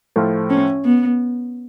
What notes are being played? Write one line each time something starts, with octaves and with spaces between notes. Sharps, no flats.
A2 F3 A3 F4
C#4
B3